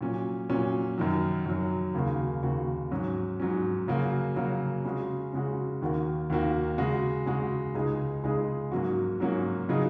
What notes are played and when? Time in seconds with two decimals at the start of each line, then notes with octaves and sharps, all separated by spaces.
0.01 A#2 F#3 C#4
0.49 A#2 F#3 C#4
0.98 F#2 D#3 F#3
1.46 F#2 D#3 F#3
1.94 D#2 C#3 A#3 F#4
2.43 D#2 C#3 A#3 F#4
2.91 G#2 F#3 C#4
3.40 G#2 F#3 C#4
3.88 C#3 F#3 A#3 F#4
4.36 C#3 F#3 A#3 F#4
4.85 C#3 G#3 C#4 F#4
5.33 C#3 G#3 C#4 F#4
5.82 D#2 D#3 A#3 F#4
6.30 D#2 D#3 A#3 F#4
6.78 C#3 G#3 F#4
7.26 C#3 G#3 F#4
7.75 C#2 C#3 G#3 D#4 G#4
8.23 C#2 C#3 G#3 D#4 G#4
8.72 G#2 F#3 A#3 C#4 F#4
9.20 G#2 F#3 A#3 C#4 F#4
9.69 C#3 F#3 D#4 G#4